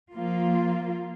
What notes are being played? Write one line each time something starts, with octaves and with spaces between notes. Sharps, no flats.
F3 A#3 F4